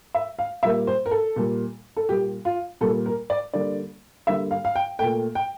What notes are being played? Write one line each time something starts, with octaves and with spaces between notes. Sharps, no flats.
E5
F5
A#2 G3 A#3 E5
C5
A#4
A4
A#2 G3 A#3
A4
A#2 G3 A#3 G4
F4
A#2 G3 A#3 A4
A#4
D5
D3 G3 A#3 D5
D3 G3 A#3 E5
F5
F5
G5
A#2 A3 G5
G5